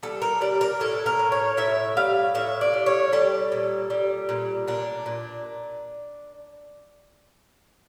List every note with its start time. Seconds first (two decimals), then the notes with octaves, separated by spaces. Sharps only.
0.03 G3 A4
0.22 A#4
0.41 G3 D5
0.61 A#4
0.80 A2 A4
1.06 A#4
1.19 A2
1.32 C#5
1.57 A2 E5
1.97 G3 F5
2.35 A2 E5
2.61 D5
2.74 G3
2.86 C#5
3.13 G3 A4
3.52 A#2
3.90 G3
4.29 A#2
4.68 A#2 D4
5.06 A#2